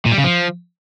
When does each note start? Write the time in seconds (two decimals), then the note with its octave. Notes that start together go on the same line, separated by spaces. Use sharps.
0.06 A#2
0.12 G3
0.18 C#3
0.24 F3